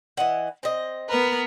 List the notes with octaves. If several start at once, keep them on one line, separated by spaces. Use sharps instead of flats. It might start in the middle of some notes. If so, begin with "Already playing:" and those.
E3 D#5 F#5
C4 D#5
B3 A#4 B4